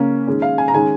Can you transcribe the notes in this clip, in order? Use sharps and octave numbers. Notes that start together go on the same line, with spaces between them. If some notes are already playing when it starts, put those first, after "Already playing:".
Already playing: C#3 A#3 C#4
D#3 G#3 C#4
F5
G#5
A#5
D#3 G#3 C#4 G#5